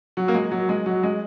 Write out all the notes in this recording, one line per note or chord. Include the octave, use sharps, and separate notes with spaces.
F#3
A#3
G#3
F#3
G#3
F#3
G#3